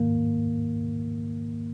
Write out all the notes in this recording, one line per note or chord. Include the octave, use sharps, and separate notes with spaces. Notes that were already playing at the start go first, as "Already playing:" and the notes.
Already playing: G#2 D#3 A#3